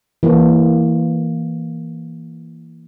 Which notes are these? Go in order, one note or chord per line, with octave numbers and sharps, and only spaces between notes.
E3 A#3